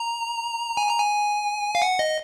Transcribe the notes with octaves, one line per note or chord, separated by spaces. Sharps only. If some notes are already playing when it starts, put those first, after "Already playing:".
Already playing: A#5
G#5
A#5
G#5
F5
F#5
D#5